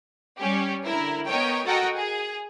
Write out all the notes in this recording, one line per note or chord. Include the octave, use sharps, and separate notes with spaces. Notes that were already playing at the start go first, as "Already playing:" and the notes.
G3 C#4 G4
D3 E4 A#4
B3 A#4 C#5 D#5 G5
F#4 A4 A#4 D#5 F#5 G5
G#4